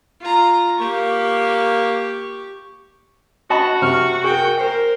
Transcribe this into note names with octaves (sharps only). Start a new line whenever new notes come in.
F4 A#5
A#3 G4 C#6
F#4 D#5 A5 B5
C3 C#6 F6
G#4 A#4 G5
A#4 C5